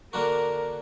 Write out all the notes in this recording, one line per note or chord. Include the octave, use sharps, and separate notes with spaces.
D3 A#3 D4 F#4 A#4